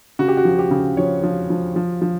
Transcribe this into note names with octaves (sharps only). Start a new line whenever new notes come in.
C#3 F#4
G4
F#4
F3
G4
C#3
F3 C#5
F3
F3
F3
F3